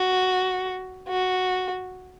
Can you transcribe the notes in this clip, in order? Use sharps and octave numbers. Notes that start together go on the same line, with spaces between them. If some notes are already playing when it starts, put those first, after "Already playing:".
Already playing: F#4
F#4